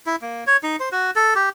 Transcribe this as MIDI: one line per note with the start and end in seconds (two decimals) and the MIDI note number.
0.06 0.16 64
0.22 0.44 58
0.47 0.57 73
0.63 0.76 63
0.80 0.89 72
0.92 1.11 66
1.16 1.34 69
1.35 1.49 67